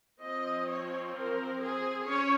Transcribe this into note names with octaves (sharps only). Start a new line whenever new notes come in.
F3 C4 D#5
C#5
A#4
G#4
C#4 C#5